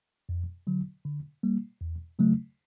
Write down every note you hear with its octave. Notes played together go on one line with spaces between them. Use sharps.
F2
D3 F#3
D3
G3 A#3
E2
C#3 F#3 A3